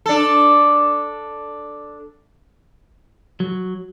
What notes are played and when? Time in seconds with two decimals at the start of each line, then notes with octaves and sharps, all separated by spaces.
0.06 D4 A4
3.40 F#3